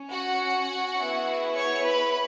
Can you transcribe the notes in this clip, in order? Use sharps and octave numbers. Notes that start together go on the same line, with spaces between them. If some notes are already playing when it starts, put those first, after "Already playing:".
Already playing: C#4
F#4 F#5
B3 E4 G#4
C#5 C#6
B4 B5